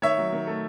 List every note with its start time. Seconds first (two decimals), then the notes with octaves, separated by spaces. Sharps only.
0.02 D#3 C#5 E5
0.18 F#3
0.32 D#3
0.47 A3